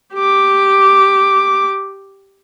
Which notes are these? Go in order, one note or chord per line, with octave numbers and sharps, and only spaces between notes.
G4 D6